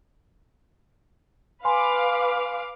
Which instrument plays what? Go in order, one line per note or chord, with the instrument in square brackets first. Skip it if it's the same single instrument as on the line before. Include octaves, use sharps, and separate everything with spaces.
[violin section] B4 F5 D6 [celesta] G#5 B5 C6